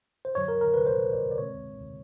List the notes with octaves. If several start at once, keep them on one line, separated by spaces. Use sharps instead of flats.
C5
F#2 D3 F#3 C#5
A#4
A#4
B4
C5
D5
D5
B2 G#3 C4 C#5